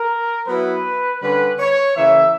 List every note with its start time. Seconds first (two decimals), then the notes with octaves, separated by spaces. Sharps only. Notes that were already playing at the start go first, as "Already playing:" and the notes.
Already playing: A#4
0.47 F#3 B3 E4 B4
1.21 D3 G3 C#4 B4
1.59 C#5
1.96 C#3 E3 A#3 E5